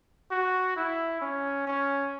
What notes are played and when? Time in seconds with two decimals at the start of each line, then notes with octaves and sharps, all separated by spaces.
0.31 F#4
0.76 E4
1.21 C#4
1.67 C#4